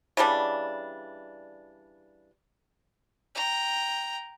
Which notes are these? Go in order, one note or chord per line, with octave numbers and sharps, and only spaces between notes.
C#3 E3 G3 D4
G5 A#5